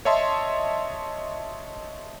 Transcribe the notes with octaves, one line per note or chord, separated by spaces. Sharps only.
C#5 D#5 E5 A5 C6